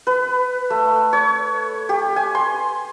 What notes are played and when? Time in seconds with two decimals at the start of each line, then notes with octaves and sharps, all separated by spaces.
0.07 B4
0.70 A3
1.13 C#5
1.89 G4
2.16 G#5
2.35 C6